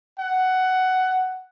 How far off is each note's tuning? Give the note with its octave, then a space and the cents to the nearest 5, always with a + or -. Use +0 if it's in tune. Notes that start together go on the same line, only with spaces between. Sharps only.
F#5 +10